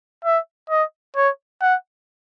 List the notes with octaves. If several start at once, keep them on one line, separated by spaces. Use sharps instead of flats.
E5
D#5
C#5
F#5